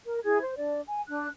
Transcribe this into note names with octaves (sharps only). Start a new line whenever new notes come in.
A#4
E4 G#4 G#6
C5
D4 D5
G#5
D4 F#6